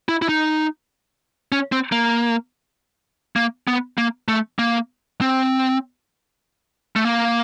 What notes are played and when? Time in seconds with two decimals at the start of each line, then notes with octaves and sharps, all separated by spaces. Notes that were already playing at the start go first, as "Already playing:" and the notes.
0.09 E4
0.22 E4
0.29 D#4
1.52 C#4
1.72 C4
1.92 A#3
3.36 A#3
3.68 B3
3.98 A#3
4.28 A3
4.59 A#3
5.21 C4
6.96 A3
7.05 A#3